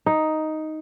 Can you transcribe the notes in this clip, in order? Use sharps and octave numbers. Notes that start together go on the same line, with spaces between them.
D#4